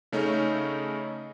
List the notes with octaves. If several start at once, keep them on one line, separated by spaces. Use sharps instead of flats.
C#3 A3 C#4 D#4